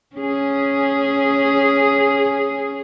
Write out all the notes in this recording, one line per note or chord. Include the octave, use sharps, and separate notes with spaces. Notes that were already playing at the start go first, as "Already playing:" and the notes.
C#4 G#4